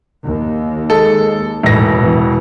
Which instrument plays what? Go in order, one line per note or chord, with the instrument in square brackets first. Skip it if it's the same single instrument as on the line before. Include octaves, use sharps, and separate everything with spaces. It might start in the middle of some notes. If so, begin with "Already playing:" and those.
[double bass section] D#2
[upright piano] G#3 A4
[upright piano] E1 A#6 [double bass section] A2 E3
[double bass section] B2 E3